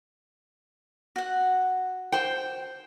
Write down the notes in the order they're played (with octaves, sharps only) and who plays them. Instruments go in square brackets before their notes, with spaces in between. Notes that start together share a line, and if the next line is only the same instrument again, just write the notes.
[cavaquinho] F#4 F#5
[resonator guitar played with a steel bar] C5 G5